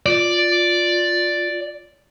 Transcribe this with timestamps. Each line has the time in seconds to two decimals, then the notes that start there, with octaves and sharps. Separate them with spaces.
0.06 F4 D5